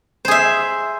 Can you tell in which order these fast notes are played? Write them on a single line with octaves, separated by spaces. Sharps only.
C5 G#4 E5